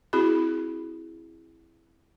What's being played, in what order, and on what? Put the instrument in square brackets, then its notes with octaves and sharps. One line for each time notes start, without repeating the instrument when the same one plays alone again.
[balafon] C4 E4 F#4 G#4 B5